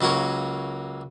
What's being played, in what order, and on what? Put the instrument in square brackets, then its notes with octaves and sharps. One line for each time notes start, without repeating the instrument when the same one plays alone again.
[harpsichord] C#2 F#3 A#3 A#4 C#5